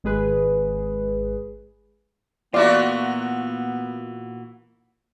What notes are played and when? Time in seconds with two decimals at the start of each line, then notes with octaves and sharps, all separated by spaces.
0.04 G#1 G#3 G#4 B4
2.54 A#2 E3 B3 F4 F#4 A#4 D5 E5